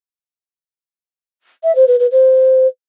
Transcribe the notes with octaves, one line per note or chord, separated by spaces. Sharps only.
E5
C5
B4
B4
C5